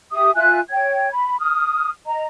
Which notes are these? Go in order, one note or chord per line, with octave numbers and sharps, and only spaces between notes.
G4 E5 D#6
F4 E5 G#5 F#6
C#5 G5 G#6
B5
D#6 F6
D#5 A#5